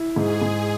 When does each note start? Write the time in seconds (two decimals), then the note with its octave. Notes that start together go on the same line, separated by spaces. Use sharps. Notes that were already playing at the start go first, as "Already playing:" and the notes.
Already playing: E4
0.16 G#2 G#4
0.42 G#2